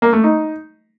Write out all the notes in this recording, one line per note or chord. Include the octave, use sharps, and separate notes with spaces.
A#3
A3
D#4